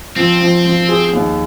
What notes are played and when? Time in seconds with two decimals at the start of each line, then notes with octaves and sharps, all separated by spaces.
0.16 F3 C4
0.41 F3
0.65 F3
0.89 G#4
1.13 D#2